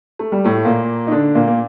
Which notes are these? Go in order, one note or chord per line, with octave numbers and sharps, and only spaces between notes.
A3
G3
A2 A3
A#2 A#3
D#4
D3 D4
A#2 A#3
A#3